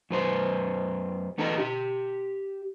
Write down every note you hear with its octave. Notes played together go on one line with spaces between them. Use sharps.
F#2 B4 C5
E2 B3 D4 A4 D#5 A#5
G4 E5